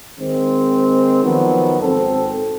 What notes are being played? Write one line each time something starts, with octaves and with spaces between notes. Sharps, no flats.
D#3 G#3 C4
D#3 F3 F#3 B3
G#1 C4 A4